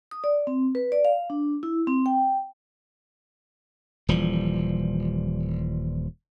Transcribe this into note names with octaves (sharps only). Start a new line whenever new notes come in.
D#6
D5
C4
B4
D5
F5
D4
E4
C4
G5
D#1 E3 F3 G3